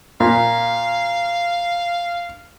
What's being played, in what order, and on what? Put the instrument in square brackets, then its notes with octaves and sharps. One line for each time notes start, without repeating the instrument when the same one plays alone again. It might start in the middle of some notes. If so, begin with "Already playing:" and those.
[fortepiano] A#2 [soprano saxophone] F5